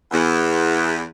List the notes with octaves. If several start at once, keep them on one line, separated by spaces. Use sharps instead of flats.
E2